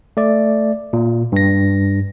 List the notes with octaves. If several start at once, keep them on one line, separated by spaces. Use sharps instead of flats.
A3 D5
A#2
G2 A#6